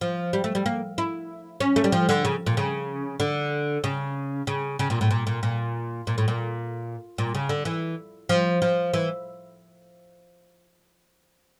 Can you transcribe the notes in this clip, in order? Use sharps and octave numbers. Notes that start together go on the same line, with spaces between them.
F3
G3
A3
G3
A#3
E4
C#4
A3
G3
F3
D3
C#3
A#2
C#3
D3
C#3
C#3
C#3
A#2
A2
A#2
A#2
A#2
A#2
A2
A#2
A#2
C#3
D3
E3
F3
F3
E3